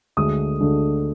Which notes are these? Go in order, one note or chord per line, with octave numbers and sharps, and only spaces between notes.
D2 D3 G#3 D#6
D2 D3 G#3